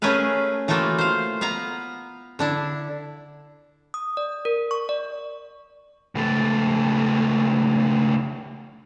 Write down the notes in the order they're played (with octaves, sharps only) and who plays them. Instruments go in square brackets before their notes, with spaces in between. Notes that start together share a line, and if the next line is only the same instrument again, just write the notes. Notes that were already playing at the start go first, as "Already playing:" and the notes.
[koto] A3 C#4 G#4 A#4 B4 F5
E3 A3 A#3 F4 F#4
C5 F5
B3 B4 F5 A#5
D3 D4 E4
[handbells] D#6
D5
A#4
C#6
D5
[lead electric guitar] C#2 A3